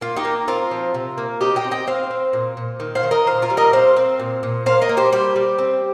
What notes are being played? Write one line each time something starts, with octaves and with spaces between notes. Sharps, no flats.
A#3 F4
D#4 G4
A#3
C4 F4 A#4
F3
C3
A#3
C4 D#4 G4
D#5 G5
C4
D#5 G5
C4 C5 F5
C4
A#2
A#2
D#3
C5 F5
D#3
A#4 D#5
A#2 C5 F5
F4 A#4
G3
A#4 D#5
C4 C5 F5
C4
A#2
A#2
A#3 C5 F5
A#4 D#5
A#3
G4 C5
G3 G4 C5
G3
C4